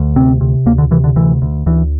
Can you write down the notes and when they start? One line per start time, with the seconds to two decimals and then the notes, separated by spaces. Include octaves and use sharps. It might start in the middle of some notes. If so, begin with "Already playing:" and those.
Already playing: D2
0.16 C3 C4
0.41 C3
0.66 D2 A#3
0.78 D3
0.91 C3 E3
1.04 D3
1.16 D2 E3
1.42 D2
1.66 D2 E3